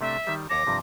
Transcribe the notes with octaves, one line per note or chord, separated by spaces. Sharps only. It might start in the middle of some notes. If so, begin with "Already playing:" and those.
C3 A3 D4 E5
D#3 G3
D#2 C#5 A5 D6 A#6
G2 C3 F3